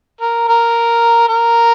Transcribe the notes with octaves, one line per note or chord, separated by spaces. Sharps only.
A#4
A#4
A#4